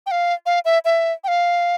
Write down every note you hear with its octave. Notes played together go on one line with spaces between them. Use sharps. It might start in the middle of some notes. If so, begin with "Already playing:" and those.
G5
F5
F5
E5
E5
G5
F5